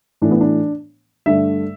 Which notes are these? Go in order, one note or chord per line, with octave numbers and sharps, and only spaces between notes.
A2 E3 A3 D4
B3
D4
G2 D3 A3 E5